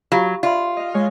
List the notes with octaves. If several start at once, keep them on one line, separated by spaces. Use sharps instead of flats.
F#3 F4 G4 F5
F4 D5 E5 C6
D#5 F5
G#3 C#5